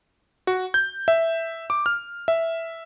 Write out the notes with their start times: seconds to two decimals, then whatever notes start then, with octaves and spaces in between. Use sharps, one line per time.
0.47 F#4
0.74 G6
1.08 E5
1.70 D6
1.86 F6
2.28 E5